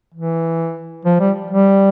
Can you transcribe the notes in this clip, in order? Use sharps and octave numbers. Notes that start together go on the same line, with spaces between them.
E3
F3
G3
G3